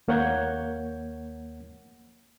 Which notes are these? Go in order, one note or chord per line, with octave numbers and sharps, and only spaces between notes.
D#2 A#3 C#5 F#5 G6 G#6